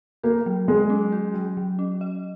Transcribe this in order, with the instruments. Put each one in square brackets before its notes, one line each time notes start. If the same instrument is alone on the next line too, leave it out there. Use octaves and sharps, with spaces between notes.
[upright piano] A#3 [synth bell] F#4
[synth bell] F#3
[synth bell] F#3 [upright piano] G#3
[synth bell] C#4
F#4
F#3
F#3
C#4
D#5